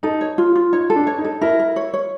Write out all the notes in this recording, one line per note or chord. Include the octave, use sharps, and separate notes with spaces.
D#4 A4
C#5
F4
F4
D#4 C#5
A4
D4
C#5
D#4
A4
E4 A#4
A#4
C#5
C#5